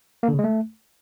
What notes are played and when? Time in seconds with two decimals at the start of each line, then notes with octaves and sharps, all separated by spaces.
0.23 A#3
0.28 D3
0.34 C#3
0.39 G#3
0.44 A3